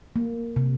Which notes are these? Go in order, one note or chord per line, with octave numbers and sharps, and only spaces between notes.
A#3
C3